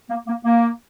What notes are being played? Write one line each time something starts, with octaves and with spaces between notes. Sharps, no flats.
A#3
A#3
A#3